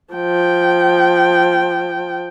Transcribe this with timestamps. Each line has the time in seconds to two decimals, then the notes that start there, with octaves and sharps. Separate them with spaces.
0.14 F3 G5